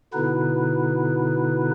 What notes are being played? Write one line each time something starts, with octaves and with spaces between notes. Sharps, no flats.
B2 D3 B3 D#4 E4 B4